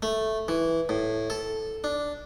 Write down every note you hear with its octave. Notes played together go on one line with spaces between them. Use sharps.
A3
E3
A2
A4
D4